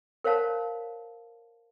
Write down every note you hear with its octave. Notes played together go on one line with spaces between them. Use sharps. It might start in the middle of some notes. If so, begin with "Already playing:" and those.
A#4 C5 C#5 F5 A5 A#5